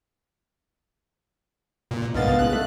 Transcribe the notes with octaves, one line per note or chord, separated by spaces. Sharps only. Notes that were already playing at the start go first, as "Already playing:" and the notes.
A#2
B1 G#2 B3 D4 A#4 D#5 F5 A6
A2 C#3 G#3 F#6
A3 E5